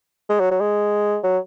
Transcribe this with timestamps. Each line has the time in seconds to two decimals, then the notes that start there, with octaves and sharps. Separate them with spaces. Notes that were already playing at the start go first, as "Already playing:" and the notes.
0.29 G#3
0.40 F#3
0.51 F#3
0.61 G#3
1.24 F#3